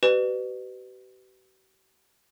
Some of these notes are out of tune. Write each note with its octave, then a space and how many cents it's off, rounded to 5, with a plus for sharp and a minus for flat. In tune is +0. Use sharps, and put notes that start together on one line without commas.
G4 -45 B4 +20 D5 +40